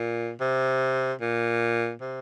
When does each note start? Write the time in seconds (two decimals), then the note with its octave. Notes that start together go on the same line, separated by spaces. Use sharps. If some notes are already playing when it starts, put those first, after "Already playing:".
Already playing: A#2
0.40 C3
1.21 A#2
2.01 C3